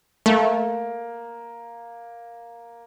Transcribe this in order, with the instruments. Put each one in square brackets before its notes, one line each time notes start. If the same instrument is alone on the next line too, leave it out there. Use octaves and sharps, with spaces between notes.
[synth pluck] A3 [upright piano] A#3